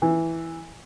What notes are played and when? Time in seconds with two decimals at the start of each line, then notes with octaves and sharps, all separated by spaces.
0.02 E3